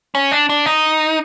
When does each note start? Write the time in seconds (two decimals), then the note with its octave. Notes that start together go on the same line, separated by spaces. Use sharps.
0.15 C#4
0.32 D4
0.49 D4
0.66 D#4